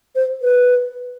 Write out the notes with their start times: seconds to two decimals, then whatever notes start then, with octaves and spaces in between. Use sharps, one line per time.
0.15 C5
0.42 B4